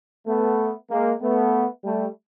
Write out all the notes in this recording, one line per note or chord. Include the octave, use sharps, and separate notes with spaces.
A3 B3
G#3 A#3
A3 B3
G3 A3